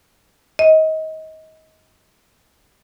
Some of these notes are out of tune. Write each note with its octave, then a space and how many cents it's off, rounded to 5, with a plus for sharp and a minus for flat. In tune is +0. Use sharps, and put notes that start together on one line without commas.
D#5 +25